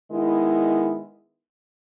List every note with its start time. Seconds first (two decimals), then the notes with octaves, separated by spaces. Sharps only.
0.11 D#3 G#3 B3 E4